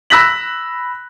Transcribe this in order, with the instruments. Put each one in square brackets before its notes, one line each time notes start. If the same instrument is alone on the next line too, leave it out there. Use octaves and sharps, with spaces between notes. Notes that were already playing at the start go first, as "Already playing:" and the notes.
[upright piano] B5 E6 F#6 A#6 B6 F#7